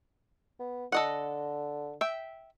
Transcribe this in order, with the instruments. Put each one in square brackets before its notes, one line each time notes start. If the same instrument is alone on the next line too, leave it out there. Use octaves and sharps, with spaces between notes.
[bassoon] B3
[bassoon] D3 [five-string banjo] A4 D#5 F#5
[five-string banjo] E5 G5